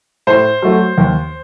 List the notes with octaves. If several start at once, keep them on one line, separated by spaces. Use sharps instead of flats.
A2 C5
F#3 A3
D#2